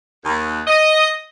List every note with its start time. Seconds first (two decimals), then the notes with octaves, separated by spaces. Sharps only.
0.25 D#2
0.67 D#5